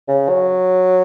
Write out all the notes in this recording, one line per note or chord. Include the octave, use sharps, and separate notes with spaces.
C#3
F#3